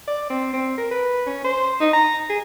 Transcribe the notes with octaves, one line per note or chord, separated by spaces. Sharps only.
D5
C4
C4
A#4
B4
C#4
C5
D#4
A#5
G#4